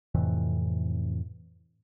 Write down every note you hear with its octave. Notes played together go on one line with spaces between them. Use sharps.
F2 A2 C3 E3